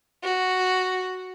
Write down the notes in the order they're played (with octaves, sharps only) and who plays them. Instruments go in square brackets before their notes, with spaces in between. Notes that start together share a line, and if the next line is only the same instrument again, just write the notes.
[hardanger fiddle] F#4